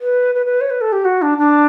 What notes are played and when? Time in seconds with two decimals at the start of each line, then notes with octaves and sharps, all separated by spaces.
0.01 B4
0.35 B4
0.46 B4
0.61 C#5
0.70 B4
0.81 A4
0.92 G4
1.05 F#4
1.22 D4
1.38 D4